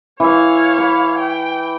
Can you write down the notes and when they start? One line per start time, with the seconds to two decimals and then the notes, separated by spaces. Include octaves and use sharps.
0.20 E3 C#5 E5 F5
0.78 B5
1.18 G5